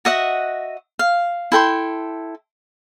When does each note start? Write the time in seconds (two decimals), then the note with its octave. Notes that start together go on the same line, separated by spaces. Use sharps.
0.05 F#4 D#5 E5 F#5
0.99 F5
1.52 E4 A4 G5 C6